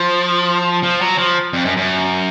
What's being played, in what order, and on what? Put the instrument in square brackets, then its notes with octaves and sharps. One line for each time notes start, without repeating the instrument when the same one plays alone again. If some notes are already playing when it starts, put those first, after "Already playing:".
Already playing: [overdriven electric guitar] F3
F3
F#3
F3
F2
F#2
F#2